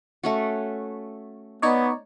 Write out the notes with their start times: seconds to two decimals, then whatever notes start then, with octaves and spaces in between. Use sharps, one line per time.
0.23 A3 C#4 F#4
1.62 B3 D#4 C#5 D5